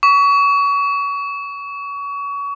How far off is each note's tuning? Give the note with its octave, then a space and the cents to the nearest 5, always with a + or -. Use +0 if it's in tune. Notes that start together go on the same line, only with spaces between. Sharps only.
C#6 +30